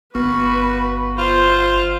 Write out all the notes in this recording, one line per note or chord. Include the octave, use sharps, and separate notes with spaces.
G1 B3 F#4 B4
F4 C5